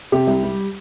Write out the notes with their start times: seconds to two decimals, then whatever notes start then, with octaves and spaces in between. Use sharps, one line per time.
0.12 C3 G4
0.27 C2
0.43 G3